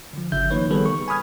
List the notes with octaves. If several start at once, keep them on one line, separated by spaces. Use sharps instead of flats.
D3 F3
G1 C#3 E5 G6
D#3 F3 A#3 D#4 B4 C#5
D#3 G3 B3 G#4 A4 B4
C#6
G#5 B5 D#6 F6 G#6